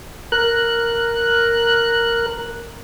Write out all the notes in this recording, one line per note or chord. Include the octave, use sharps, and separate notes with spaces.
A#4 F#6